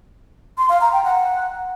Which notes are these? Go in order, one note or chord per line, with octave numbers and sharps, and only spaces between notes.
C6
F5
A#5
G5
F#5